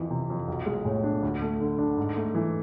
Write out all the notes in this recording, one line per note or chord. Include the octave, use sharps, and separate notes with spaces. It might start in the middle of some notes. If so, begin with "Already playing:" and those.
Already playing: F2 E3
C3
F2
B1
G#3
A2
D4
D2
A3
D3
D4
G#2
A3
E3